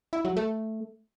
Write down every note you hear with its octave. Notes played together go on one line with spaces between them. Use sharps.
E4
F#3
A3